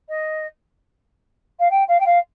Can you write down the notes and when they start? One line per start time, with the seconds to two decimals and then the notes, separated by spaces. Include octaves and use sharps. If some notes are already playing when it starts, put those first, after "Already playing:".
0.09 D#5
1.60 F5
1.71 G5
1.88 F5
2.00 G5
2.06 F5